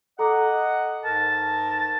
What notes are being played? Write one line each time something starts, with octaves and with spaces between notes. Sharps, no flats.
A4 D#5 F#5 A#5 D6
G#2 A#4 A5